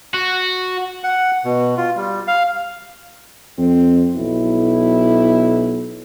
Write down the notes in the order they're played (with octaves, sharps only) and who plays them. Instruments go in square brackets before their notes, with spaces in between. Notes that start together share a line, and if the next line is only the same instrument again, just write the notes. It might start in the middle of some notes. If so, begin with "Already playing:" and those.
[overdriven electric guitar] F#4
[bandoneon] F#5
B2
F4
G3
F5
[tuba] F2 [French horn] C4
[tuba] B1 [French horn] E4